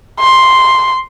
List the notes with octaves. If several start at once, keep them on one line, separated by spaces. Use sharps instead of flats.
C6